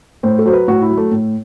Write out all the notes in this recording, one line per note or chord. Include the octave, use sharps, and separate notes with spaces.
A2 C5
A4
F#3 C5
B4
A2 F#4
E4
F#3
A3
A2